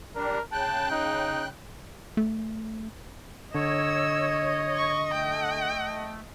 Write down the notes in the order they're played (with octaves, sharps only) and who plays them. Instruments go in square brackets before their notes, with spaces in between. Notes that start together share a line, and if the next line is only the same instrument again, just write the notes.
[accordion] G3 D4 [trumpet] A#4
[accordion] C#3 G5 F#6 [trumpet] A5
[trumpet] D#4
[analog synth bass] A3
[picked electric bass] D3 [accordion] C#5 [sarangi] D#5 [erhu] E6
[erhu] C#6
[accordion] A3 [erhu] G5